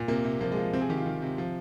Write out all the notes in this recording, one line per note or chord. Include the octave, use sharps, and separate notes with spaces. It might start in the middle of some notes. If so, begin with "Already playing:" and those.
Already playing: A#2
C3 A#3
C3
F3 A#3
G#3
F3
C3 C4
G#4
D#3 G4
F4
D#3
C3
F3